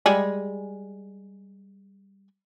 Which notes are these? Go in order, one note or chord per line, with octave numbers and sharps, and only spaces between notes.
G3 G#3 G#4